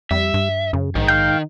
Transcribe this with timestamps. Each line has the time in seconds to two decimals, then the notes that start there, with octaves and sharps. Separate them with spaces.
0.11 F2 G3 E5
0.34 G2
0.73 F#2 C#3
0.95 A#1 G#2 D#3
1.08 F5 G5